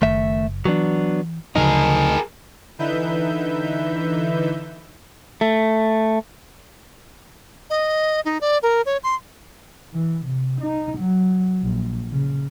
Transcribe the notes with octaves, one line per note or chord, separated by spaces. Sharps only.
F#1 D#3 A3 E5
E3 F#3 B3 D4
D2 G2 C#3 F3 F#3 D#4 G#4 A#4
D3 E3 D#4 B4 E5 G6
A3
D#5
D#4
D5
A#4
C#5
C6
E3
C3
D#4
F#3
A#1
C#3